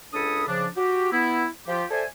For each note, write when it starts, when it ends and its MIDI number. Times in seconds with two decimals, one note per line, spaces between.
0.14 0.44 37
0.14 0.44 62
0.14 0.44 69
0.14 0.44 73
0.14 0.44 83
0.14 0.44 87
0.48 0.66 49
0.48 0.66 53
0.48 0.66 62
0.76 1.10 66
0.76 1.10 67
1.12 1.46 59
1.12 1.46 64
1.68 1.85 53
1.68 1.85 65
1.68 1.85 67
1.91 2.04 69
1.91 2.04 72
1.91 2.04 74
1.91 2.04 76
1.91 2.04 80